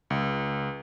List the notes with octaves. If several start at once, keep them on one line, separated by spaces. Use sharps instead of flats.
C#2